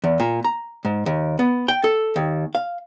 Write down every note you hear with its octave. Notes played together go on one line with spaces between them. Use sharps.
E2
A#2
A#5
G#2
D#2
B3
G5
A4
D#2
F5